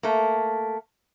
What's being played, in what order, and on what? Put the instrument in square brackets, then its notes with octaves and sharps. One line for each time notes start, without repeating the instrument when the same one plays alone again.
[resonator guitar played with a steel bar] A3 A#3